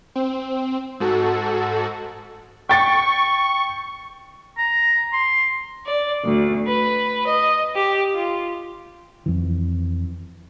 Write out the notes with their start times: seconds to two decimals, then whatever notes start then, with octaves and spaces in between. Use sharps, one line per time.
0.15 C4
1.00 G#2 F#4 A4
2.69 G5 C#6 A6
4.58 A#5
5.13 C6
5.85 D5
6.24 D2
6.67 B4
7.26 D#5
7.74 G4
8.14 F4
9.26 F2 E3